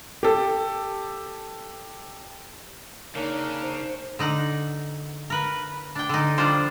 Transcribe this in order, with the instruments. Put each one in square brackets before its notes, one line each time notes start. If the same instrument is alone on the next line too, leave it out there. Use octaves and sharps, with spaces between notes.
[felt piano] G4 A4
[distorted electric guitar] C#3 [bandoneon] A#3 D4 A#4 [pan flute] D#4 [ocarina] C#5
[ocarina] C5
[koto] D3 D#4 F#5
A#4 B4
D4 G5
D3 D#4
F3 G3 D4 F4 C5